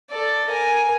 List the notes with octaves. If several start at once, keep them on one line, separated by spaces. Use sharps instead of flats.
A4 D5
A#4 G#5